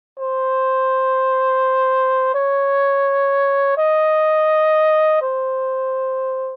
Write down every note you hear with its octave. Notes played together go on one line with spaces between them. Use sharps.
C5
C#5
D#5
C5